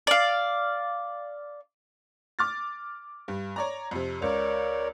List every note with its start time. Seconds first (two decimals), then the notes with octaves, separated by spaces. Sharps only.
0.07 D5 F5
2.39 D6 F6 A6
3.28 G2
3.56 C#5 D5 A#5
3.91 F2 C3
4.22 C#2 A#4 C#5 D5